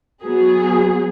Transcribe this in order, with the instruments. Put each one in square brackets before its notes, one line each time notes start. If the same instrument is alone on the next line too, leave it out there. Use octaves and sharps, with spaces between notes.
[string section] F#3 B3 G#4